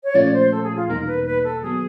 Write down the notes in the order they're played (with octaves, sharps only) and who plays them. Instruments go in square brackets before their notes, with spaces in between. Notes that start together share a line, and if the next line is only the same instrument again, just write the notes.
[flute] C#5
[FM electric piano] A#2 F3 A3 C#4 F4 [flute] D5
[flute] C5
A4
G#4
F4
[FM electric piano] E2 B2 G3 A#3 D#4 [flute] A#4
[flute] B4
B4
A4
[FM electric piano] D#3 F#3 B3 [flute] G#4